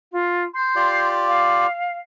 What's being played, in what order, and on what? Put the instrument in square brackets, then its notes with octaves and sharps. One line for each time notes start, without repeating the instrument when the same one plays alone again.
[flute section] F4
C6 G6
[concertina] F4 G4 D5
[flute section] F5